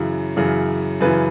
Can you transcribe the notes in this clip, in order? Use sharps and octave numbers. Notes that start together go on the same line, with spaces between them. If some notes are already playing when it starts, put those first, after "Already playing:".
Already playing: F#2 C#3 E3
F#2 C#3 E3
F#2 C#3 E3 B4